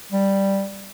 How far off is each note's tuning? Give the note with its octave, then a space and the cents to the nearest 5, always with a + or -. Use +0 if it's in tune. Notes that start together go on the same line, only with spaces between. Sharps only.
G3 +0